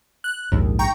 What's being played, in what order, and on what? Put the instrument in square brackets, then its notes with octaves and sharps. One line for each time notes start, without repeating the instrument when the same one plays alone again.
[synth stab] F#6
[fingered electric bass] A#1 G#2 [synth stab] D#2
[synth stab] G5 A#5 C#6